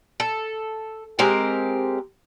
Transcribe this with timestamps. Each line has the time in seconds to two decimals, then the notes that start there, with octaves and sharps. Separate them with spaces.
0.20 A4
1.19 G#3 C4 G4 A#4